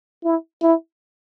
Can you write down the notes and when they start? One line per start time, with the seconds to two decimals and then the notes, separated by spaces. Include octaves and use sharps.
0.24 E4
0.62 E4